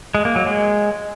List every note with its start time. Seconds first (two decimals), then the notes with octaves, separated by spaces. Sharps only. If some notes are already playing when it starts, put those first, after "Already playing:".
0.15 G#3
0.25 A#3
0.36 F#3
0.46 G#3